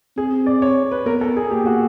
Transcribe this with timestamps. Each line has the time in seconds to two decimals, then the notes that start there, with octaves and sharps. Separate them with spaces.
0.17 C4 G#4
0.46 D5
0.62 C#5
0.92 B4
1.06 B3 A#4
1.21 A4
1.37 G#4
1.51 A#3 G4
1.62 G4
1.66 F#4